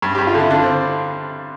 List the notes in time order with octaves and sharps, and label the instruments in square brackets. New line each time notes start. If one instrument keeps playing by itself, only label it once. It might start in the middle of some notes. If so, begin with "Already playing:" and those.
[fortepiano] G2
G4
G2
F4
D3 E4
D3 D4
C4